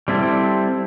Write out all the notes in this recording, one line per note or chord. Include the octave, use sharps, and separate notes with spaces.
G3 C4 E4 A4